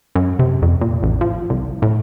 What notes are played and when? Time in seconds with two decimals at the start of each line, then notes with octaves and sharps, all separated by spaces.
0.15 F#2
0.39 C3
0.62 F2
0.81 A#2
1.03 A1
1.21 F3
1.50 C2
1.82 A2